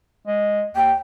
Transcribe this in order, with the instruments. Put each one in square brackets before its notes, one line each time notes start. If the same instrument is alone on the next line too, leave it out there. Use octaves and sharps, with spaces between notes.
[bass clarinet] G#3
[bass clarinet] D#2 [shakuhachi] G5